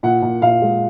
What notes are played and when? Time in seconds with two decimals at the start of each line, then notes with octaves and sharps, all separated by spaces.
0.03 A#2 F#5
0.22 A#2
0.42 A#2 F5
0.62 G#3